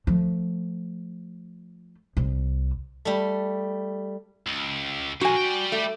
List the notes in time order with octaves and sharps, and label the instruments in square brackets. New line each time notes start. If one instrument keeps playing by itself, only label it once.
[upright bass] F3 A3
C2
[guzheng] G3 A3
[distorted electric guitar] C#2
[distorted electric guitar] F3 A#3 [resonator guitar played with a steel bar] F#4 G#5
[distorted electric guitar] G3 G5
[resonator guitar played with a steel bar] A3